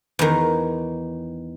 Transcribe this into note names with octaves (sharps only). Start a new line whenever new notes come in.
E2 D#3